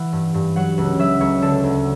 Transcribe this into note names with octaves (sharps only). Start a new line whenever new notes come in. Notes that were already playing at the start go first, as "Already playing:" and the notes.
Already playing: E3 F#5
G2
G2
F#3 F#5
C#2
F#3 E5
C#2 C#5
D3 A4
D2